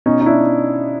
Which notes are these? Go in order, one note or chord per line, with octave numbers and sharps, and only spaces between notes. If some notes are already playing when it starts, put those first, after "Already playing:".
B2 C#4 D#4
D#4
D4 E4